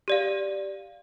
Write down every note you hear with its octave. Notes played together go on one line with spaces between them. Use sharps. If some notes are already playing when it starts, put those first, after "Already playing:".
G4 D5 F5